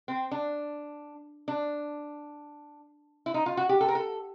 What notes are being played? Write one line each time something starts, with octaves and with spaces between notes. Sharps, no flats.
C4
D4
D4
E4
D#4
F4
F#4
G4
A4
A#4
A4